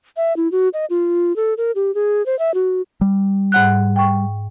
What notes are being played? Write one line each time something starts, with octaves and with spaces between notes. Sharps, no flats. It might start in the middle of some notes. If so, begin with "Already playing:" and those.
E5
E4
F#4
D#5
F4
A4
A#4
G4
G#4
C5
E5
F#4
G3
G#2 F#5 F#6
G5 C#6